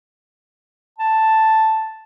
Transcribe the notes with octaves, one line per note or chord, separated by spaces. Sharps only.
A5